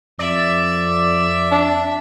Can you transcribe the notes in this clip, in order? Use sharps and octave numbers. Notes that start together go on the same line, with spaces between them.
F2 D5 E5
D4